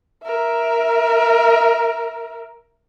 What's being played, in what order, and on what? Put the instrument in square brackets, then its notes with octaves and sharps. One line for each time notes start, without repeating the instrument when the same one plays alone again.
[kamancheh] A#4 E5